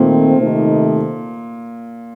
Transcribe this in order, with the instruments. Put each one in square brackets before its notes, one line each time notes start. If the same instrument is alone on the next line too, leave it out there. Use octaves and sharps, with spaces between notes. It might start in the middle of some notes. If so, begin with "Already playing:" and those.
Already playing: [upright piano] A#2 [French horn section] D#3 A3 C4
[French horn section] C3 D#3 A3 D#4